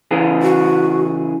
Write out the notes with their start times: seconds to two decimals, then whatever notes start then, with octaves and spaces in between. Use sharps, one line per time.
0.11 C#3 E3 G#4
0.43 F#4